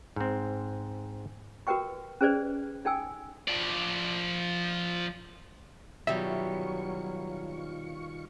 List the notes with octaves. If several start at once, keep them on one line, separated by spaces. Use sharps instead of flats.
G#2 C4
F#4 A#4 B4 G5 C#6
C#4 G#4 B4 C5 D5
D#4 A4 G5 G#5 E6
F3 D5
B2 D#3 F#3 G3 F4 E5 C#6